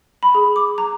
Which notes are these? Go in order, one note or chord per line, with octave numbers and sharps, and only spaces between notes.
B5
G#4
D6
A#5